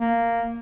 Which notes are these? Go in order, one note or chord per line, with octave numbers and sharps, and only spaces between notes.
A#3